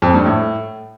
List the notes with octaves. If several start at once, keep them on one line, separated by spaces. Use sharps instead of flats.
F2
G2
A2